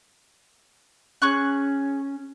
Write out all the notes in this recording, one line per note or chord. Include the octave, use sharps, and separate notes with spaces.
C#4 G#4 C#6 F#6